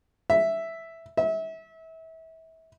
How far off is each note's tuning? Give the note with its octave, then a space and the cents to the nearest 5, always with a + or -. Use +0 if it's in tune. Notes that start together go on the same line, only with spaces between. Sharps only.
E5 +0
E5 -30